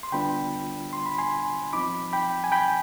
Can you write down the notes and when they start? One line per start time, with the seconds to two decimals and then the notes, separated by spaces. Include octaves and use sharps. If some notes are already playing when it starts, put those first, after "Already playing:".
0.03 C6
0.12 D3 G3 B3 D4 F4 G5 B5
0.93 C6
1.06 B5
1.18 G#5 C6
1.73 F3 C4 D#4 B5 D6
2.13 G5 B5
2.44 G#5
2.52 G5 B5